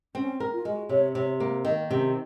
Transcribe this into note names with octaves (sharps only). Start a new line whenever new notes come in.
C4 C#4
A#4
F4
G#3 F#4
C3 C#5
C3 C#5
A#3 C5
D#3 A#4
C3 C#4